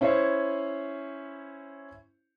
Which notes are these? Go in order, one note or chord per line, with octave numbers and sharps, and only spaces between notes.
C#4 E4 C5 C#5